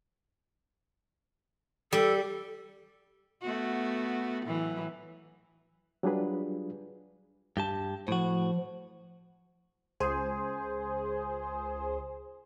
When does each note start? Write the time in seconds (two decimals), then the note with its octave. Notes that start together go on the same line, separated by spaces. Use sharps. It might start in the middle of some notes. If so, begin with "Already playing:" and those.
1.93 G3 A4
3.43 A3 B3 F#4
4.45 A2 E3 F#3
6.03 F#3 G3 D4 F4 G#4 B4
7.57 G2 G4 A5
8.08 A2 F3 F#4
10.00 C#2 G#4 C5